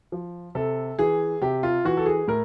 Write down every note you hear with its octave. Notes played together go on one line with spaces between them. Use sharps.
F3
C3 A4
E3 G#4
C3 G4
F4
E3 F#4
A4
G#4
A2 A#4